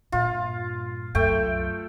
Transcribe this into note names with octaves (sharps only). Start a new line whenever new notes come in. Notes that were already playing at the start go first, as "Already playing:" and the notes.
G2 A#2 F4
C2 F#2 A3 G5